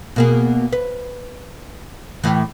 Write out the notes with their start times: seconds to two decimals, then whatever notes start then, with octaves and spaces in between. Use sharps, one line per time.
0.16 B2 A#3 G#4
0.72 B4
2.24 A2 E3